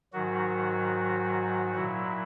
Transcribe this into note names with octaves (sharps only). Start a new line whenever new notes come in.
G#2 D#3 F#3 F#4
A#2 F#3 E4